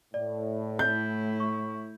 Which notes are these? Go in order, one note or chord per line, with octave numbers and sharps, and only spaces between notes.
A2 D5
A3 E4 G6
C#6